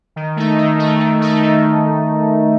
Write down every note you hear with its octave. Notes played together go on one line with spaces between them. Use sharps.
D#3
A3 D#4
D#3
A3 D#4
D#3
A3 D#4
D#3